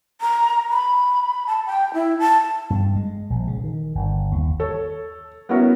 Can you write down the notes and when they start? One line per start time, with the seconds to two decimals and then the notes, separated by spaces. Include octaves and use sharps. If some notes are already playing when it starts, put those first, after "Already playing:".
0.21 A#5
0.69 B5
1.47 A5
1.66 G5
1.94 E4
2.19 A5
2.70 G2
2.96 G#3
3.30 A#1
3.47 C#3
3.64 D#3
3.95 G1
4.32 D#2
4.60 A4 C#5
5.49 B3 C#4 E4 F#4 A#4